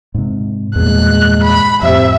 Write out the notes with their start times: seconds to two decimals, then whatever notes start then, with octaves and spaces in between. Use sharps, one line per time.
0.14 G#2 C3
0.75 E2 G2 A#2 G#3 F#6
1.43 B5
1.82 F2 A2 C3 E5